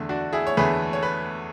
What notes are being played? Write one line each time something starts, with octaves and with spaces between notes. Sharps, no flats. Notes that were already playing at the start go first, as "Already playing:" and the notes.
Already playing: E2 D3 A3
D4 F#4
E4 G#4
C#5
E2 D3 A3 G#4 B4
C#5
B4